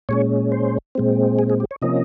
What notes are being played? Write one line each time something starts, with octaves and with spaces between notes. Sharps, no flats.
A#2 G#3 C#4 C#5
C5
A#2 G#3 C4
G#4
G#4
G4
C#5
C3 F3 A#3 C#4 D#5